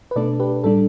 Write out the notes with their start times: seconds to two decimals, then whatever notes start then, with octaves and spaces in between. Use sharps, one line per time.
0.11 B4
0.16 B2 A3 D4 A4 D5
0.40 G4 B4
0.64 A2 G3 D4 A4